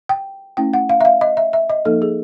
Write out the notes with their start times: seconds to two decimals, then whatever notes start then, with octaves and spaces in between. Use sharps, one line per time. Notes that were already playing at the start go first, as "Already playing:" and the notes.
0.09 G5
0.57 A3 C#4 E4 G5
0.73 F#5
0.89 F5
1.01 E5
1.05 F5
1.21 D#5
1.37 E5
1.53 E5
1.70 D#5
1.85 F3 A#3 D#4 A4
2.02 G#4